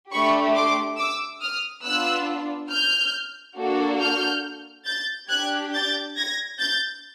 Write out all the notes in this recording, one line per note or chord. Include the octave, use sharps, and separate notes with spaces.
A3 D4 G4 B5 C#6
C6 D6
D6 E6
D#6 F6
B3 D4 F4 E6 F#6
F6 G6
A#3 D4 F#4 A4
F6 G6
G6 A6
D4 G4 F#6 G#6
G6 A6
G#6 A#6
G6 A6